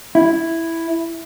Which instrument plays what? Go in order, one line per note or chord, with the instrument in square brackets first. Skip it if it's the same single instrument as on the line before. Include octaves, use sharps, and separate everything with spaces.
[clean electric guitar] E4